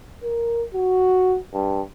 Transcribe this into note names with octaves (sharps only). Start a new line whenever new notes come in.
A#4
F#4
G2